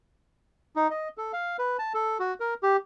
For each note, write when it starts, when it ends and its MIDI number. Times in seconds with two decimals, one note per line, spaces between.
0.76 0.88 63
0.90 1.08 75
1.18 1.32 69
1.33 1.57 77
1.59 1.77 71
1.79 1.93 81
1.94 2.18 69
2.19 2.34 66
2.40 2.54 70
2.63 2.76 67